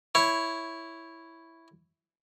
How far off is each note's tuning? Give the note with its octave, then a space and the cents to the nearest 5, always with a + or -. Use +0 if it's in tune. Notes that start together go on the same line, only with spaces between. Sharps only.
E4 +0 C#5 +0